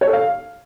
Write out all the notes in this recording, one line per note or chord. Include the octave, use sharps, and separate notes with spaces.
C#5
A4
F5